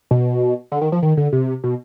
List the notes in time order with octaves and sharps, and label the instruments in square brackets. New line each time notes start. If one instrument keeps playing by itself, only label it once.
[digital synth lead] B2
D3
D#3
F3
D#3
D3
C3
B2